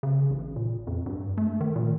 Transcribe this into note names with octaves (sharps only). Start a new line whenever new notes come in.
C#3
A1
A#2
F2
G2
A3
D#3
A#2